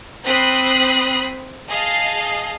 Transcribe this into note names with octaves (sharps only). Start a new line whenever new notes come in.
C4 B5 D#6 F#6 B6 C7
G#4 D#5 F5 A5 C7